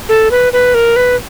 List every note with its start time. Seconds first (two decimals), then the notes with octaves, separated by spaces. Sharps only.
0.09 A4
0.31 B4
0.53 B4
0.74 A#4
0.96 B4